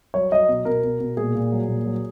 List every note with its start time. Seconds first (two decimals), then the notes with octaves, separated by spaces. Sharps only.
0.14 F#3 C#5
0.31 F#3 D#5
0.49 B2
0.65 B2 A#4
0.84 B2
1.00 B2
1.17 A#2 G#4
1.35 A#2
1.52 F#3
1.68 A#2
1.85 F#3